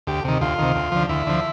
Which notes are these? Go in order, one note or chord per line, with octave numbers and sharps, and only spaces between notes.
D2 G4
C3 D#3
D2 F4
C3 D#3
D2
D3 F3
D2 E4
D3 F3